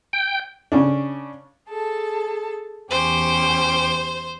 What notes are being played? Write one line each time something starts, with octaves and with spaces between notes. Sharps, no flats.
G5
C#3 C#4 D4
G#4 A4 A5
E2 C#4 G4 C5